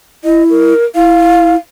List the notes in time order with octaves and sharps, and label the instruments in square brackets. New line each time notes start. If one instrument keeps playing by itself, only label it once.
[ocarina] E4 [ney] D#5
[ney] A#4
[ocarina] E4 [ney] F5